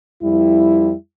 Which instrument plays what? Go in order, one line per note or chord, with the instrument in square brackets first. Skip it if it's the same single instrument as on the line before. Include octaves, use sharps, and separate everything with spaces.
[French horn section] F2 G3 E4